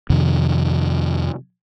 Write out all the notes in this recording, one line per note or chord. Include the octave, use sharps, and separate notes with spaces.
F2 C3 D#3